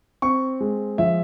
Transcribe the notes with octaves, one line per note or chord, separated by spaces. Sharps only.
C4 C#6
G#3
F3 E5